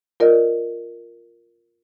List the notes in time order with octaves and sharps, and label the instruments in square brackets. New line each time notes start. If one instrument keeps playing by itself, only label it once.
[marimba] F4 A#4 D5 D#5